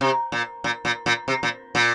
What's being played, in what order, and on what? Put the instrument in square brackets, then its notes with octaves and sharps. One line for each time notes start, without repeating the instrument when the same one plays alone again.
[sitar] C3
A#2
A#2
A#2
A#2
C3
A#2
A#2